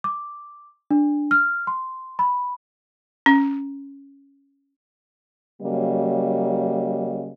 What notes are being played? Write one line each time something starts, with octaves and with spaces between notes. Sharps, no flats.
D6
D4
F6
C6
B5
C#4
C#3 F#3 G3 A#3 D#5